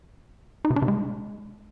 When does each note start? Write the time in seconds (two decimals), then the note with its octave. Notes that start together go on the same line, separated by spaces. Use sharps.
0.65 D#4
0.70 C3
0.76 D4
0.82 C3
0.88 G#3